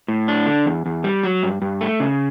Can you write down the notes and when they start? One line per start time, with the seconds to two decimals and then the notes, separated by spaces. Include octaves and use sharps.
0.08 A2
0.28 D4
0.46 D3
0.66 E2
0.86 E2
1.04 G3
1.24 F#3
1.43 G2
1.62 G2
1.81 A3
2.00 C#3